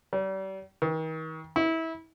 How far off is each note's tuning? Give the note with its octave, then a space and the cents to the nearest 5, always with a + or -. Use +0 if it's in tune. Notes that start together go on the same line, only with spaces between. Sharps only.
G3 -35
D#3 +40
E4 -25